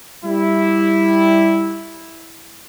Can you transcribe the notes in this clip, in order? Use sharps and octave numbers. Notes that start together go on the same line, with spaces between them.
G3 E4